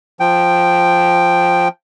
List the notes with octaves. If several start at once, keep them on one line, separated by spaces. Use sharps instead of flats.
F3 G5